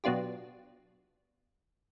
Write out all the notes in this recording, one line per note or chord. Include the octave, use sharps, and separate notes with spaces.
B2 F#3 B3 D4 F4 G4